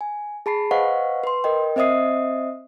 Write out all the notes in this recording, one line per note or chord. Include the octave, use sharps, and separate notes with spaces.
G#5
G#4 A5 B5 C7
B4 C5 D#5 F5 F#5 C#6
B4 C6
A#4 D#5 G5
C4 C5 D#5 E5 D#6 C7